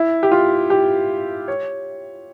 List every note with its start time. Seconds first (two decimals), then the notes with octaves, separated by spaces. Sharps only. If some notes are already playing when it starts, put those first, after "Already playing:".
Already playing: E4
0.23 G4
0.32 F4
0.70 G4
1.48 C#5